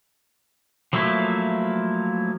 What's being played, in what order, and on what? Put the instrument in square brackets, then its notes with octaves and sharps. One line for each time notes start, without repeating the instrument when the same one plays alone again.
[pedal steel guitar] F3 F#3 A3 A#3 E4